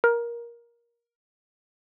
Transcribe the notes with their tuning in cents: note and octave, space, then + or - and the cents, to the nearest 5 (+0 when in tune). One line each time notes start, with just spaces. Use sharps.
A#4 +15